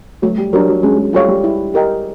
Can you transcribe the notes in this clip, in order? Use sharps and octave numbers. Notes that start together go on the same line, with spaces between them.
F#3 A3
G3
F#3 D4 G4 A#4
F#3
G#3 C#4
G#3
G3 F4 A4 C#5 F5
G3
E4
G4 A#4 D#5 G5